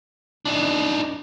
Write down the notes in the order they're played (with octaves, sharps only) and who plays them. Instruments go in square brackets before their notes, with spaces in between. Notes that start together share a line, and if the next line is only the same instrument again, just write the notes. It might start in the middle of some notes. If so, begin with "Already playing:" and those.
[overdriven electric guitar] D4 D#4